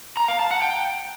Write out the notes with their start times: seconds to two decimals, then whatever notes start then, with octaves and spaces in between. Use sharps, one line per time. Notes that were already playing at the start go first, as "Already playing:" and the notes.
0.17 A#5
0.28 F5
0.39 A5
0.51 F#5
0.62 G5